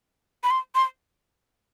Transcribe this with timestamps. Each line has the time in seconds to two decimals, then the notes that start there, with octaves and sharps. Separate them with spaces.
0.44 B5
0.51 C6
0.75 C6